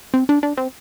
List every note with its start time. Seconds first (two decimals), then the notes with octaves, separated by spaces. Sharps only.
0.14 C4
0.29 D4
0.43 D4
0.57 C4